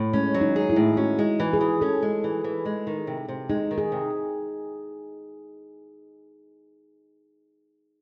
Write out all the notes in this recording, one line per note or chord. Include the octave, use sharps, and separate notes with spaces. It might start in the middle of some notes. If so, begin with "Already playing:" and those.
Already playing: A2
G#3 C#4
F#3
D#4
G#4
E4
A2
C#4 F#4
G#3
E3
G#4
E3
C#4 A4
G#3
E3
E3
G#3
D#3
C3
C3
G#3 D#4
D#3
G#4
C3